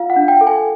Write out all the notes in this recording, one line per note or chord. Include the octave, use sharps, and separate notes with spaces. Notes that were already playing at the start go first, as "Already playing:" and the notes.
Already playing: F4 F5
F#5
D4
G5
A4
G#5